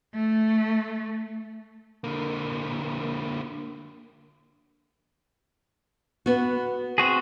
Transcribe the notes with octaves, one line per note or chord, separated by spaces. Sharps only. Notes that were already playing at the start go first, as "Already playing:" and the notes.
A3
D3 A#3
B3 F#4
C4 F#4 G#4